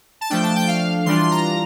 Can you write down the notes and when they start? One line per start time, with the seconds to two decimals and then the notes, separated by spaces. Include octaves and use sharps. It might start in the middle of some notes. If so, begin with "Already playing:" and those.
0.21 A5
0.30 F3 A3 D4 G5
0.43 A5
0.56 G5
0.68 F5
1.06 E3 G3 D4 F4 C6
1.18 C6
1.31 A#5